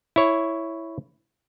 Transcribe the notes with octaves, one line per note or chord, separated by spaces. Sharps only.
E4 C#5